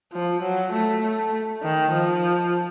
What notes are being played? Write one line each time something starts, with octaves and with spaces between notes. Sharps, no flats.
F3
F#3
A3
A3
D#3
F3